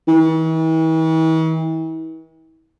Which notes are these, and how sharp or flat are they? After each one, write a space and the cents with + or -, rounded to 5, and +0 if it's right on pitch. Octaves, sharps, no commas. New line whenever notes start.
E3 -45